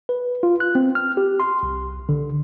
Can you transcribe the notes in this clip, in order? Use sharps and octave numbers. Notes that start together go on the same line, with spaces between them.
B4
F4
F#6
C4
F6
G4
C6
C2
D3